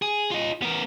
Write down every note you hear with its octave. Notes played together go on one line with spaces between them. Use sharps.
G#4
F4 D#5
B3 A#4